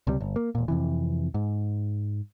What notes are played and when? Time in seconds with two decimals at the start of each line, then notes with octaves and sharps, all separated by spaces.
0.07 C#2 C3 G3
0.21 G1
0.36 A#3
0.55 E1 A#2
0.68 F2 C3 E3
1.34 G#2